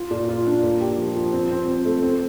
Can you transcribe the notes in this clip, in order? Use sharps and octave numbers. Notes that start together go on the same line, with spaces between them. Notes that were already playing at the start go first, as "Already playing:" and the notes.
Already playing: F4
A#2
F4
D4
A#3
G4
F3
F3
C4
C4
C4
A3
C4